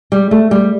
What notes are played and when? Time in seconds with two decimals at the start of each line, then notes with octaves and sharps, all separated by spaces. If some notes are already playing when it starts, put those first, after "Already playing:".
0.12 G3
0.31 A3
0.51 G3